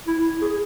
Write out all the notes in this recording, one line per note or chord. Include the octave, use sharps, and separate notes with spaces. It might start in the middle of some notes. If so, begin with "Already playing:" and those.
E4
G#4